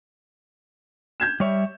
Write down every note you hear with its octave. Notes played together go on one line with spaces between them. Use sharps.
G6 G#6 E7
G3 C#5 E5